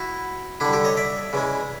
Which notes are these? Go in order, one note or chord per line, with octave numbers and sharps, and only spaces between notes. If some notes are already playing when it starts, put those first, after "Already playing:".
Already playing: E4 F#4
D3 G3 D4 E4
G4 A4
C#5 D#5
D5 E5
C#3 E3 G#3